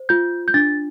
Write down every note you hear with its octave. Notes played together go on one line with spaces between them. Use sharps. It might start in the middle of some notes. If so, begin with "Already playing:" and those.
Already playing: C5
F4 G6
G6
D4 A6